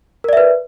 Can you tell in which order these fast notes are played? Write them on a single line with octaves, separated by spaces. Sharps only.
A#4 D5 E5 B4